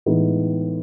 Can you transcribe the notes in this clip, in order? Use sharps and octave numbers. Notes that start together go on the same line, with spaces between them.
A2 E3 G#3 B3 D#4